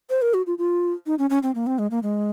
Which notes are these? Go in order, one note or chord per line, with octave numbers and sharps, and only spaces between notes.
C5
A#4
F#4
F4
F4
D#4
C#4
C#4
C4
A#3
C4
G#3
A#3
G#3